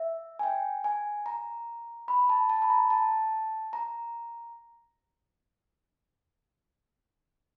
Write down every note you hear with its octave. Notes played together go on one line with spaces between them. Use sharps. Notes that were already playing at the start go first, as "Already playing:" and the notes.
Already playing: E5
G#5
G5
G#5
A#5
B5
A5
A5
B5
A#5
A5
A#5